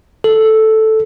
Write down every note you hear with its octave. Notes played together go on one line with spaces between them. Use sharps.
A4